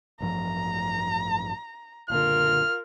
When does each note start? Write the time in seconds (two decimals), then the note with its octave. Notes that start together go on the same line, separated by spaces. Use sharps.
0.20 A1 G2 F3 A#5
2.10 F#1 A#2 D3 F4 A#4 F6